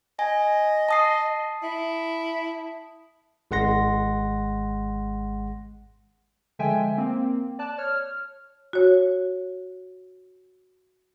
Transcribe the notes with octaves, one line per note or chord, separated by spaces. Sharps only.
D#5 G#5
A5 D#6 C7
E4
G#1 G#3 F#5 C6 A#6
D3 F3 G#3 E5 G5 G#5
A#3 C4
D5 A5 F#6
C#5 F6
F#4 C#5